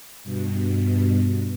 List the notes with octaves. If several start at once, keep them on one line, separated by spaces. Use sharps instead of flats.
G2 B2